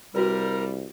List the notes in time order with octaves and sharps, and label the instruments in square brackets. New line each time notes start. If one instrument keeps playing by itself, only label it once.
[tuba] C2 [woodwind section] G3 [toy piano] F#4 B4 [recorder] A#4